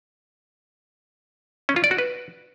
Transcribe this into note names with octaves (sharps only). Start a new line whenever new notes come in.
C#4
F4
D5
F#4
B4